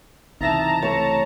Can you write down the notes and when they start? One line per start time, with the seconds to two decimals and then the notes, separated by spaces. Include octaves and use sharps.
0.41 C#2 C3 E3 D#4 E5 A5 A#5
0.82 A3 C#5